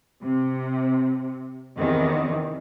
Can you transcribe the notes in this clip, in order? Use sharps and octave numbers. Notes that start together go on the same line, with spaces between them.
C3
E2 C3 D#3 E3